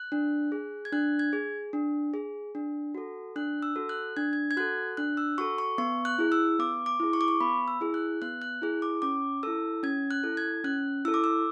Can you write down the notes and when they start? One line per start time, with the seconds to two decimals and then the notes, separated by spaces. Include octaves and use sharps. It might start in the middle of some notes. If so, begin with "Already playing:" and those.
Already playing: F#6
0.12 D4
0.52 G#4
0.85 G#6
0.93 D4 F#6
1.19 G#6
1.33 G#4
1.73 D4
2.14 G#4
2.55 D4
2.95 F#4 A4
3.36 D4 F#6
3.63 E6
3.76 F#4 A4
3.89 F#6
4.16 D4 G#6
4.33 G#6
4.51 G#6
4.57 F#4 A4 F#6
4.97 D4 F#6
5.17 E6
5.38 F#4 A4 C#6
5.58 C#6
5.78 B3 C#6
6.05 F#6
6.18 E4 G#4
6.32 E6
6.59 B3 D6
6.86 D6
7.00 E4 G#4
7.13 C#6
7.21 D6
7.28 C#6
7.41 B3 B5
7.68 E6
7.81 E4 G#4
7.94 F#6
8.22 B3 F#6
8.42 F#6
8.62 E4 G#4
8.82 D6
9.02 C#4 D6
9.43 E4 A4 E6
9.83 C#4 G#6
10.11 F#6
10.23 E4 A4
10.37 G#6
10.64 C#4 F#6
11.05 E4 A4 E6
11.14 D6
11.24 E6